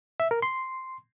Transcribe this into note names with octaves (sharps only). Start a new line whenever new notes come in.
E5
A#4
C6